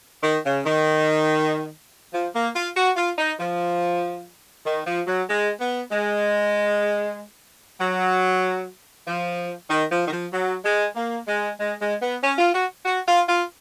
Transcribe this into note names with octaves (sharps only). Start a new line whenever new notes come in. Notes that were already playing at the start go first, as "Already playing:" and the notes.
D#3
C#3
D#3
F3
A#3
F4
F#4
F4
D#4
F3
D#3
F3
F#3
G#3
B3
G#3
F#3
F3
D#3
F3
D#3
F3
F#3
G#3
A#3
G#3
G#3
G#3
B3
C#4
F4
F#4
F#4
F4
F4